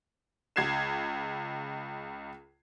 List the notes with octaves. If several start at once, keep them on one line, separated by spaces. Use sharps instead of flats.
C#2 G#6 C7 E7